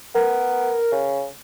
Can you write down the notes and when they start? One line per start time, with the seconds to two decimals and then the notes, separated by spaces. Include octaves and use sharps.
0.15 B3 A#4
0.92 C#3